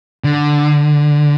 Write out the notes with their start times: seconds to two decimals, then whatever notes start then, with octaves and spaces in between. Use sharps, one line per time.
0.24 D3